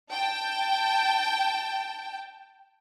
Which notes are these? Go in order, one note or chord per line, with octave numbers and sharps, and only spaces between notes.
G5 A5